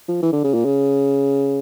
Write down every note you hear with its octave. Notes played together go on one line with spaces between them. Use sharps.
F3
E3
D3
C#3
A#2
C#3